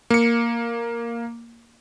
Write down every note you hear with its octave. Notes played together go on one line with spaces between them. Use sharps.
A#3 C#7